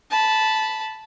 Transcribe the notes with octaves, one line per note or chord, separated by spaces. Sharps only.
A5 B5